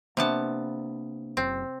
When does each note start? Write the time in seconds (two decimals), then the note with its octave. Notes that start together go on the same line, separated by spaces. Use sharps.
0.17 C3 A#3 B3 D4 A5
1.37 F#1 C4